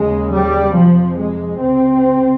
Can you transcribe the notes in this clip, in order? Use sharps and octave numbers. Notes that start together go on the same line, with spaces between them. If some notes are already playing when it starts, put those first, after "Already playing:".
Already playing: D#2 C#3 G#3
G3
F2 C3 F3
G#3
C#2 C3 C4